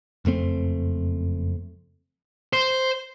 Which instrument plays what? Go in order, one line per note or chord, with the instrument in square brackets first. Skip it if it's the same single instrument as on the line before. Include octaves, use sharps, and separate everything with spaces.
[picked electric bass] F#1 F2 A3 C4
[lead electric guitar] C5